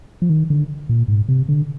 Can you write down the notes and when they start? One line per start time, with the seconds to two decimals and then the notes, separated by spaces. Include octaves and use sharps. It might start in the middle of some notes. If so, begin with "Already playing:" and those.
0.22 F3
0.30 D#3
0.50 D3
0.89 A#2
1.08 G#2
1.29 C3
1.49 D3